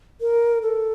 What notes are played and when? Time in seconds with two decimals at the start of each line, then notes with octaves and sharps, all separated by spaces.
0.21 A#4
0.62 A4